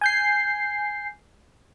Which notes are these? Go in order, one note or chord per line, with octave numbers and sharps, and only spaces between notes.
G#5 G6 C7